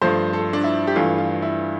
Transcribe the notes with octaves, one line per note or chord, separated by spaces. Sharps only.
G2 F3 A3 C5
A4
D4
E4
G4
G2 E3 A3 F4
F4
E4